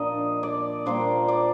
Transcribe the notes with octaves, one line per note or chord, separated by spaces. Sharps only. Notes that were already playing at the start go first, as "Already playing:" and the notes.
Already playing: A#2 F3 A#3 D4 D#5
D5
A#2 G3 A#3 D4 C5
D5